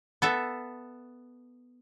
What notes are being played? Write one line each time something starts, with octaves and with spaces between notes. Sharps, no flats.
B3 A4 E5